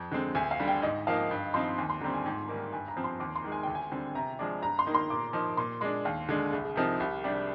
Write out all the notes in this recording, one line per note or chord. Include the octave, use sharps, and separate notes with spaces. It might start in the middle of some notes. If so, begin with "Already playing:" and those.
Already playing: F2
D3 G#3 C4
D2 G#5
F5
D3 G3
G5
G#2 D#5
F3 A#3 D#4 F5
G2
F3 C4 D#4 C6
D#2 G#5
C6
D3 G3 C4 A#5
G#5
G#2 G5
D#3 G3 A#3
G2 G#5
A#5
F3 C4
C6
D#2 D6
C6
D#3 G#3
G#5
D2 G5
G#5
D3 G3 C4
C3 A#5
F3 G#3 D4
G2 A#5
C6
D#3 A#3 D#4
C6
A#2 D6
F3 A#3 D#4
A#2 C6
G#3 D4 C6
D#2 F5
D3 G#3 D4
C2 G#4
G#4
C3 F3 C4 D#4 A#4
C2 G4
C3 G3 D4